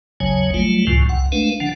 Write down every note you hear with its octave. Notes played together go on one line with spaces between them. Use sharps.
A1 D#2 C#3 F#3 C#5 G#5
F#3 G3 A3 F4
C#2 F#2 A2 C3 F3
C2 F#5
G#3 A3 D4 B4 F5
D3 F3 D4 F#5